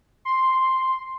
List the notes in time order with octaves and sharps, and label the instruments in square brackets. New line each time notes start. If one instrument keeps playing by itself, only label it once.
[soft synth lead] C6